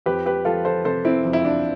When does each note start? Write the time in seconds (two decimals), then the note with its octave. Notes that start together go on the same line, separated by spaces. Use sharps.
0.06 F2 G4 B4
0.26 G4 B4
0.45 F3 F4 A4
0.65 A4 C5
0.85 C3 A4 C5
1.05 C4 E4
1.24 F2
1.33 E4
1.45 D4